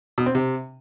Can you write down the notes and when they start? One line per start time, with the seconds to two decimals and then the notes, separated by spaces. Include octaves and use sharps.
0.18 B2
0.26 C4
0.35 C3